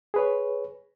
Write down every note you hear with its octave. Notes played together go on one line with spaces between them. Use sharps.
G#4 B4 C#5